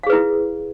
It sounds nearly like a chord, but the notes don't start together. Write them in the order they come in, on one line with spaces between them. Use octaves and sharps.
F5 G#4 B4 E4